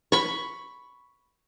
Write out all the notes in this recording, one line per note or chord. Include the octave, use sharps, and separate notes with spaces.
B5 C#6